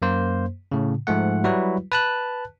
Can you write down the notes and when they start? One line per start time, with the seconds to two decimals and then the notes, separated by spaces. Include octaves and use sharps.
0.02 F#2 A#3 C5
0.72 A2 C#3
1.07 G#2 F3 A3 F#5
1.44 F#3 G3 E4 F#4 B4
1.91 B4 A5 F#6